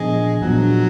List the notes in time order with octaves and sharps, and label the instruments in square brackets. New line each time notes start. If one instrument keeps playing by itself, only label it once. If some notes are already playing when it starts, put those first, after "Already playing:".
Already playing: [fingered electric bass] A#2 F3 B3 D4 [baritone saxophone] G#3
[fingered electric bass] A#2 F3 B3 D4 [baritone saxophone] F#3